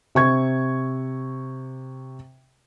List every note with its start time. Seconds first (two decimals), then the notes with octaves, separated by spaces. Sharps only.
0.15 C3 C#6 G#6